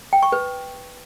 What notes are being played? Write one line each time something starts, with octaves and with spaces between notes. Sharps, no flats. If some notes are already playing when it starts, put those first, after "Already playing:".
G5
C#6
B4